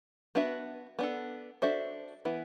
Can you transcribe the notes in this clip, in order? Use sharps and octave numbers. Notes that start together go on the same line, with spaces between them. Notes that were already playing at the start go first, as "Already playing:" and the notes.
B3 D4 F#4 B4 E5
B3 D4 A4
D4 F#4 A4 C5 E5
E3 B3 E4